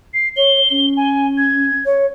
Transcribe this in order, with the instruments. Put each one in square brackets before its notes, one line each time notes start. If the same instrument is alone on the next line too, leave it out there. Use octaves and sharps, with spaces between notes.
[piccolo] C7
[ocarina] C#5 [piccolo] G7
[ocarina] C#4
[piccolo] G#5
G#6
[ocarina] C#5